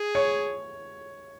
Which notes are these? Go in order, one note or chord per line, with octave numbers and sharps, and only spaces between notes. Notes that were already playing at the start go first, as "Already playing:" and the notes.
Already playing: G#4
C#5